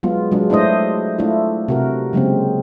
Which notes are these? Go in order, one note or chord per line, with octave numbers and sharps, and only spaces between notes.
F#3 G#3 B3 F4
F#3 G#3 D4
A3 D4 E4 C5 D#5
A3 D4 E4 F4
C3 F#4 A#4
C#3 F#3 G#3 A#3 C4